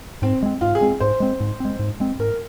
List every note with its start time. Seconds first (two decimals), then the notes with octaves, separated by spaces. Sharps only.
0.22 G#2 C4
0.42 G#3 C4
0.61 G#2 F4
0.75 G#4
0.81 G#3 C4
1.00 G#2 C5
1.20 G#3 C4
1.40 G#2
1.60 G#3 C4
1.79 G#2
2.00 G#3 C4
2.19 G#2 A#4